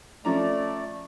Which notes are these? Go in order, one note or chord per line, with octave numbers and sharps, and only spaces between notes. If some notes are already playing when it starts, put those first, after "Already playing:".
F3 A3 C#4 D5 A#5